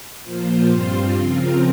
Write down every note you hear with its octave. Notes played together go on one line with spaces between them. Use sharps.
A#2 F3 A#3 F4 C5
G2 G3 C4 F4 C5
C#3 F3 C4 F4 A#4